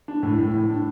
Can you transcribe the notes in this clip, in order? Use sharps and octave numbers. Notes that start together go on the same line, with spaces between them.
D4
A2
A2
A2
D4